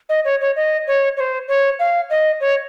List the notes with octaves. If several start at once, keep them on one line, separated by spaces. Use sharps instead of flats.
D#5
C#5
C#5
D#5
C#5
C#5
C5
C#5
F5
D#5
C#5